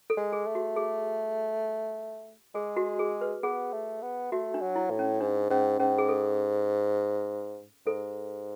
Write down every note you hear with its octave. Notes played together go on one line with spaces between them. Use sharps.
A4
G#3
G#4
A3
F#4
G#4
G#3 G#4
F#4
G#4
B4
B3 G#4
A3
B3
A3 F#4
D4
F#3
E4
A2
C#4
G#2 D4
G#2 C#4
G#2 C#4
G#4
A4
G#2 A4